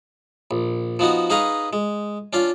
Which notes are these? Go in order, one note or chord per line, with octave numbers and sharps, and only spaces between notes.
A#1
F3 B3 D#4 F#4
D#4 G#4 B4 F5 A#5 C#6
G#3
C#4 D4 F4 F5